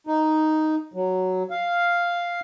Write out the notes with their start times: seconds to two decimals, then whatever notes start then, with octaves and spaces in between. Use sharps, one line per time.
0.07 D#4
0.94 F#3
1.51 F5